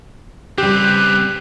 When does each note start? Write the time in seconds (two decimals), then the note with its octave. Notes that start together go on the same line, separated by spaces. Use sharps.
0.58 C#3 G3 C4 G4 B4 F#6